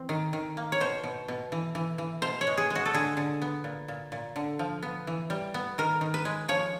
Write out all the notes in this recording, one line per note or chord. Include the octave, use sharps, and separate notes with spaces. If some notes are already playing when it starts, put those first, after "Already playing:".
Already playing: E3 C4
D#3
D#3
A#3
C#5
B2 C5
B2
B2
E3
E3
E3
B2 C5
C#5
G#3
G#4
G#3
F#4
A4
D3 G#4
D3
B3
A#2
A#2
A#2
D3
F3
B3
E3
G3
B3
D#3 A#4
D#3
B4
G#3
F3 C#5